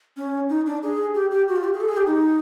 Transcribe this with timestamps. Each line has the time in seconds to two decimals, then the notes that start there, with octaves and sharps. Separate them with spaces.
0.17 C#4
0.49 D#4
0.66 D4
0.83 G#4
1.15 G4
1.31 G4
1.48 F#4
1.56 F4
1.64 G4
1.73 G#4
1.80 A4
1.89 G#4
1.97 G4
2.06 D#4